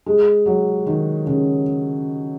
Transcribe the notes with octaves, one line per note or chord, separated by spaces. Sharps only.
G#3
F#3
D#3
C#3